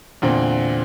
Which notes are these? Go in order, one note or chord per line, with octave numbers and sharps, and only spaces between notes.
E2 A#2 D3 C4